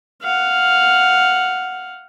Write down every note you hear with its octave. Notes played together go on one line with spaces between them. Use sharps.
F5 F#5